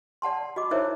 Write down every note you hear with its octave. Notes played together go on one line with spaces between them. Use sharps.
D5 F#5 A5 C6
F#4 D#5 D6
D#4 E4 A#4 C5 C#5 E5